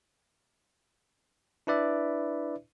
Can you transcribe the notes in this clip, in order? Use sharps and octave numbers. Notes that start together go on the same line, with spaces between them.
D4 E4 B4 D5 E5